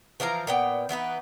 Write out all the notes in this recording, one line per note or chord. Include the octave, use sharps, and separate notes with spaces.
E3 F3 F5 A#5
A#2 B3 G5
E3 B3 D#4 B4